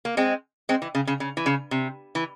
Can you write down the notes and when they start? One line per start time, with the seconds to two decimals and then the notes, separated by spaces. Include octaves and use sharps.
0.05 A#3
0.17 G#3 C4
0.69 G#3 C4
0.82 E3
0.95 C#3
1.07 C#3
1.20 C#3
1.37 E3
1.46 C#3
1.71 C3
2.15 E3